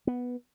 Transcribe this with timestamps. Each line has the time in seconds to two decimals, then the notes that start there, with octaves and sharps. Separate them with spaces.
0.07 B3